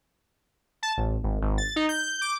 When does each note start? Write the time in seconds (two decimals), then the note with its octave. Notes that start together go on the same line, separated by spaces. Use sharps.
0.83 A5
0.97 A1
1.24 G#1
1.42 G#1
1.58 A6
1.76 D#4
1.89 G6
2.21 D6